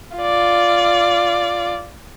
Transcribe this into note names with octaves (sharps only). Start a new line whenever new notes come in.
F4 D5